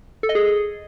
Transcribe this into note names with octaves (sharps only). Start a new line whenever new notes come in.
A4
D#5
G#4